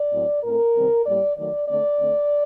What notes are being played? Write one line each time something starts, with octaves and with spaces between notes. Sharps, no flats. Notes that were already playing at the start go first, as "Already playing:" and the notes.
Already playing: D5
A2 F#3 C4
A2 A3 C4 A#4
C3 D#3 G3 C4
A2 G3 A#3 D5
D#3 F#3 A3 D5
D3 A3 C4 D5
D3 A3 C4